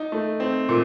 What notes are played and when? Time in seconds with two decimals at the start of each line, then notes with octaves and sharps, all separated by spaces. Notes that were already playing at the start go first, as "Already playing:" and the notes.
Already playing: D#4
0.12 A3
0.40 C4
0.69 A#2